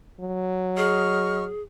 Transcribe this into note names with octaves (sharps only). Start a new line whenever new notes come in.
F#3
G#4 D#5 C#6 F6